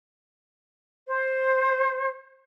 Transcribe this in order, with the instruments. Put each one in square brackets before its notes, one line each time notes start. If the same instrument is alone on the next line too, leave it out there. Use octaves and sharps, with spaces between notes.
[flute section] C5